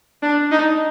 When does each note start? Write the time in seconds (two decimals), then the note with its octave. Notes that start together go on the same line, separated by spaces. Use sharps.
0.22 D4
0.51 D#4